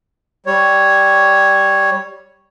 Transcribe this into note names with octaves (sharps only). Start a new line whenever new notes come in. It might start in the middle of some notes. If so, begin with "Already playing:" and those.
G3 C#5